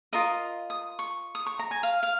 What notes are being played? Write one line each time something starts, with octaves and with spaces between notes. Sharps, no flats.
F4 A#4 D#5 D#6
D#6
C#6
D#6
C#6
A#5
G#5
F5
F5